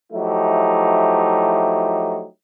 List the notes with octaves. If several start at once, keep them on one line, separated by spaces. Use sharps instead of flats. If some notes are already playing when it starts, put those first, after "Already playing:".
F3 F#3 A3 D#4 E4 G4